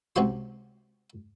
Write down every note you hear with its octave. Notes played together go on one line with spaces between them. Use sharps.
C#2 C3 F#4 G4 C6